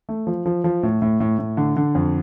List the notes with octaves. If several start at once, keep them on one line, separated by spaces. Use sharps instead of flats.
A3
F3
F3
F3
A2
A2
A2
A2
D3
D3
F2